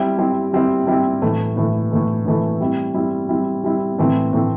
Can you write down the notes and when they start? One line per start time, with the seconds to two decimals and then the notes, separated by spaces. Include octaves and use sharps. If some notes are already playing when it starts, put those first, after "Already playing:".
Already playing: G3 C4 E4 G4
0.18 G3 C4 E4 G4
0.53 G3 C4 E4 G4
0.87 G3 C4 E4 G4
1.22 A2 E3 A3
1.57 A2 E3 A3
1.91 A2 E3 A3
2.26 A2 E3 A3
2.60 G3 C4 E4
2.94 G3 C4 E4
3.29 G3 C4 E4
3.64 G3 C4 E4
3.98 A2 E3 A3 C4
4.33 A2 E3 A3 C4